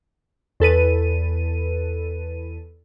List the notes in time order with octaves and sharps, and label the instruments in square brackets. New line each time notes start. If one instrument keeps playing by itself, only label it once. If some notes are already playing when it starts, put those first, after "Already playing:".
[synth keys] E2 A4 B4 D#7